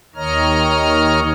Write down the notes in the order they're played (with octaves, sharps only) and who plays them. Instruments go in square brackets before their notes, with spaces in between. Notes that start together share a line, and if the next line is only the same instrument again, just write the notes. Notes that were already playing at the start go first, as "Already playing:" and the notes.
[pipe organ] D#2 D#3 C#5 D#5 A#5 F6